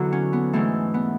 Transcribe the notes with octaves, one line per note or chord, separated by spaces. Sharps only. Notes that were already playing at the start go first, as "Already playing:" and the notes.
Already playing: E2 D3 F#3 E4 F#4 G#4
C#4
B3
G#2 E3 A3
B3